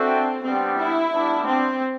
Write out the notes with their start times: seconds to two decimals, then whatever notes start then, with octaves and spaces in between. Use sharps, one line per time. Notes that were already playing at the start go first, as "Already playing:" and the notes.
Already playing: C4 D4 F#4 A4 E5 G5
0.44 G3 B3 C4 D4 G4
0.79 E4
1.13 G3 B3 D4
1.47 C4